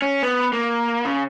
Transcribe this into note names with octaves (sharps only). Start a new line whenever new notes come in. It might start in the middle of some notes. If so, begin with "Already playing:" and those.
C#4
B3
A#3
C#3